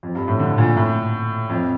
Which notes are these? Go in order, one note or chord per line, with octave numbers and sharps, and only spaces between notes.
F2
G2
A2
D3
A#2
A2
F2